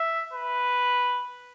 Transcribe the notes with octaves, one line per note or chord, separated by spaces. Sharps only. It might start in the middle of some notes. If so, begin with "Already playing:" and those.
Already playing: E5
B4